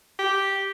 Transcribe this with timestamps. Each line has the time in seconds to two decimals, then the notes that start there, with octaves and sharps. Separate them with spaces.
0.19 G4